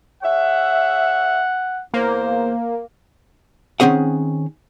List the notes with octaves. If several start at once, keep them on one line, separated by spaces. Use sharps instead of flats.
G#4 C#5 E5 F#5
E2 A#3 C5
D#3 C4 C#4 G#4 F#5